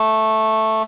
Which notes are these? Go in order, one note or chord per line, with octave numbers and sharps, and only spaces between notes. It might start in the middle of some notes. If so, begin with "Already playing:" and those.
Already playing: A3